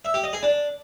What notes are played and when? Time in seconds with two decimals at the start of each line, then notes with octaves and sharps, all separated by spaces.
0.05 E5
0.14 G4
0.24 D#5
0.33 G#4
0.43 D4